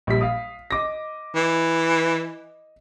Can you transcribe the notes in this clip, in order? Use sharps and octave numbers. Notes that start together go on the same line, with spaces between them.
A#1 G3 B6
F5 D#6
D#5 D6 A#6
E3